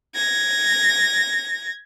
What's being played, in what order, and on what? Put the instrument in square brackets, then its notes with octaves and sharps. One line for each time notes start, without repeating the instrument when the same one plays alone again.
[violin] G#6 A#6